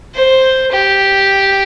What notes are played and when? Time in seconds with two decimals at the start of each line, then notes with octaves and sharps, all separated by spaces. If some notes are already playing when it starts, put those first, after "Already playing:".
0.15 C5
0.71 G4